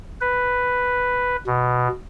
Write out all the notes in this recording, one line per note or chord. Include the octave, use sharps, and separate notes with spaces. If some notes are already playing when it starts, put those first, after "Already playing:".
B4
B2